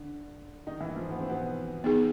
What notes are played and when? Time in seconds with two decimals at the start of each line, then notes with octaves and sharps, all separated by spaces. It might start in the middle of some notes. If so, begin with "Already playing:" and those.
Already playing: D3 D4
0.67 D#3 D#4
0.80 E3 E4
0.96 F3 F4
1.11 B3
1.20 C4
1.30 B2 B3
1.84 B3 D#4 G#4